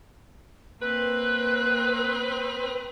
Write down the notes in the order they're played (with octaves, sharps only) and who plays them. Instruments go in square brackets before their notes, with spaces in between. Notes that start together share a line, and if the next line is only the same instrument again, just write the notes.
[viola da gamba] A#3 [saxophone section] C4 B4 [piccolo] F#6